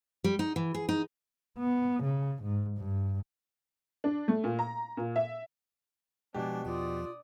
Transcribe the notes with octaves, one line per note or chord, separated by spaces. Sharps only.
G3
D#4
E3
G#4
D#4
B3
C#3
G#2
G2
D4
A3
A#2
A#5
A#2
E5
B2 F3 G#3 D4 G4 G#5
E2 F3 F4 D5 D#6